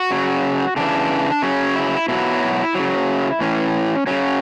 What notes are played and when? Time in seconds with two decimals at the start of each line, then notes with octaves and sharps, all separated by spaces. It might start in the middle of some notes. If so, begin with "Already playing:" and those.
Already playing: F#4
0.11 C#3 F#3
0.76 C#3 E3 D4
1.42 C#3 F#3 C#4
1.75 E4
2.08 B2 F#3 E4
2.75 C#3 F#3
3.41 A2 E3 C#4
4.07 C#3 F#3 C#4